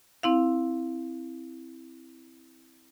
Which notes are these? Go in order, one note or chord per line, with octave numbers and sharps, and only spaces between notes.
C4 E4 F5